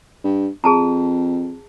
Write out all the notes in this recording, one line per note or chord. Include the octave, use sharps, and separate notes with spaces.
G2
F2 G#4 A5 A#5